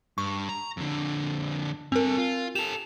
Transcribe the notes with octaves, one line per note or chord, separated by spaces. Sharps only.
G2 C#6
A#5
F2 D3
G2 C4 A4 A#4
F4
G4 A4 E7 F7